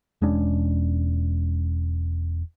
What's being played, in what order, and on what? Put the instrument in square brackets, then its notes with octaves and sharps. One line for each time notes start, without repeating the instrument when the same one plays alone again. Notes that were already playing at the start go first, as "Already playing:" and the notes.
[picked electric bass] E1 G#3 C#4 D4